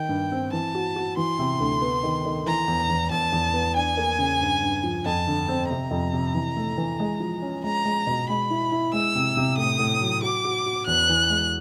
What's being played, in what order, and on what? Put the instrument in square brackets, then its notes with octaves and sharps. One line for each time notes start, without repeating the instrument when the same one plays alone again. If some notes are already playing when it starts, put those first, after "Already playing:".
Already playing: [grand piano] D#3 [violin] G5
[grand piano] G2
C4
[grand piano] E3 [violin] A5
[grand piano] F#4
F#4
[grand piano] E3 [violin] C6
[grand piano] C3
D2
B3
D#3
D#3
[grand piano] E3 [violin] A#5
[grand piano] E2
E2
[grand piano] E2 [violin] A5
[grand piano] E2
B3
[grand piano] D4 [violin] G#5
[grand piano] A#3
C#3
G2
G2
F3
[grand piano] F2 [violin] A5
[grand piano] D3
C4
[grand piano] C3 [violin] A#5
[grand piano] F2
C3
E3
A3
E3
G#3
F3
C#4
[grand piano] G#3 [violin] A#5
[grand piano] G#3
B2
[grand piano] G#3 [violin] B5
[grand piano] E4
E4
[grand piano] G#3 [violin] E6
[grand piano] C3
C3
[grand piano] A2 [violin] D#6
[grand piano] A2
F#3
[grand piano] F#4 [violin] D6
[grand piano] F#4
F#4
[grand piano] E2 [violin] F#6
[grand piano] E3
G#3